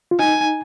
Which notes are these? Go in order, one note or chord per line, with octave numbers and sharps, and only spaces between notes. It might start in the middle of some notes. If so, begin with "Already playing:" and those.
F4
D#4 G#5